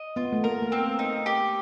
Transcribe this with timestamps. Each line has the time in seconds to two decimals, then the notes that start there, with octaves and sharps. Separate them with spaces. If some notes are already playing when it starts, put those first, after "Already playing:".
Already playing: D#5
0.16 B3 F4
0.32 A3
0.44 A#3 A#4
0.62 A#3
0.72 C4
0.99 D#4
1.26 G4